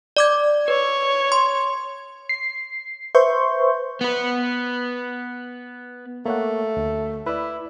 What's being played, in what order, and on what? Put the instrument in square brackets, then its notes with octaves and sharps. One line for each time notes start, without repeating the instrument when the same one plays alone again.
[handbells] D5 D6 G#6
[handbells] B4 [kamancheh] C#5
[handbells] C6
[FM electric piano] C7
B4 C5 E5 C6 C#6 G6
[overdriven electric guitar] B3 B4
[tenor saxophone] A3 [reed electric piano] A#3 C#5 F#5
[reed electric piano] D2
[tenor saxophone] E4 [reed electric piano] B4 D5